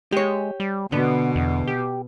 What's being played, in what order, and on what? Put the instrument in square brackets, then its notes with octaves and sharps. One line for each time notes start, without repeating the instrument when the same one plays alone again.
[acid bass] G#3 [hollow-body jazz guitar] G4 C#5
[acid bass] G3
[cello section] B2 [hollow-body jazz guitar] D3 [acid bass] B3
[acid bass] E2
G4